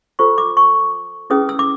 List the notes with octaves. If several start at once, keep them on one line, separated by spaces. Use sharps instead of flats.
F4 A4 C5 C#6
D6
C#6
C#4 E4 G#4 B4 D#6
E6
D6